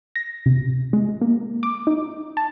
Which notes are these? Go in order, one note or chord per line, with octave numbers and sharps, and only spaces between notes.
A#6
C3
G#3
A#3
D6
D#4
A5